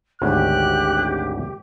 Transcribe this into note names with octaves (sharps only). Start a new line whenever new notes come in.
G#1 D2 C#4 G4 F#6